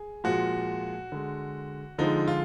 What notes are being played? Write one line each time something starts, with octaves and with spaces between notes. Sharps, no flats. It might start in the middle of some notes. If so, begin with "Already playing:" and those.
Already playing: G#4
A#2 F3 G#3 F#4
D3 G#3
D3 F3 G#3 D#4
F4